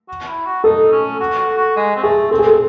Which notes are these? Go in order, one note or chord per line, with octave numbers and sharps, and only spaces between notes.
F#4
E4
F#4
D#4 A4
C#4
F#4
F#4
F#4
G#3
C4
A3 G#4
C4 A4
G#4
A4